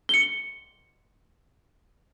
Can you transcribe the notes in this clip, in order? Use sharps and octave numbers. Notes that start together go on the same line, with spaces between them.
C#7 G7